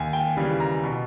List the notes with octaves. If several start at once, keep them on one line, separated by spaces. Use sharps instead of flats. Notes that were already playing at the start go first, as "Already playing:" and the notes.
Already playing: D#2 G#5
G5
C#3 E3 G3
A#5
B2